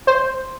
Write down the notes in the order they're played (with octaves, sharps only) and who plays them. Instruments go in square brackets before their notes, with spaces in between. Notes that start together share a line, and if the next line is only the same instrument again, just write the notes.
[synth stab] C5